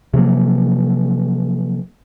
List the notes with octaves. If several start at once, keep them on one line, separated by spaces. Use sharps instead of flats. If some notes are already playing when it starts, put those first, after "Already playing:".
C3 F3 F#3 A#3